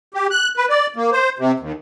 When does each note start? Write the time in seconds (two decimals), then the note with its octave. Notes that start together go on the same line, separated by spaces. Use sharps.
0.14 G4
0.31 F#6
0.57 B4
0.70 D5
0.96 A#3
1.12 C5
1.39 C3
1.60 D#2